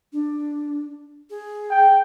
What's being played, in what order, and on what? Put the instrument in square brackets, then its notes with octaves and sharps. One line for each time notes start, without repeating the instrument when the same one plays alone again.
[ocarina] D4
G#4
[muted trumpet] G5